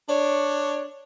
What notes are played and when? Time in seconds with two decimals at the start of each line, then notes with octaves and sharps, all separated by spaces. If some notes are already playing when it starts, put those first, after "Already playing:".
0.07 D4 C#5